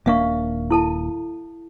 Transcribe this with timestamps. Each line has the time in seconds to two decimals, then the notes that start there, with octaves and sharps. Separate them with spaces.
0.06 D#1 A#3 D4 E5 F5 C#6
0.70 E4 A4 A5